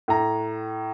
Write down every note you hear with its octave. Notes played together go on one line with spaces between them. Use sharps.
A2 A#5